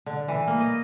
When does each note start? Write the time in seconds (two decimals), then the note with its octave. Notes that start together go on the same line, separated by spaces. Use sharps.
0.06 D3
0.28 E3
0.47 A#3
0.60 D#5